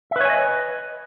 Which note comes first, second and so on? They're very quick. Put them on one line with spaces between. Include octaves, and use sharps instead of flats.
E5 B4 C#5 G#5 D#5